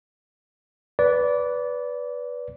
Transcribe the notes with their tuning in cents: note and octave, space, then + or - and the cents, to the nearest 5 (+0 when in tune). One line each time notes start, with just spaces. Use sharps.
B4 +0 D5 -20